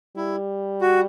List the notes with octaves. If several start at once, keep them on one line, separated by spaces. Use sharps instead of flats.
G3 E4
F#4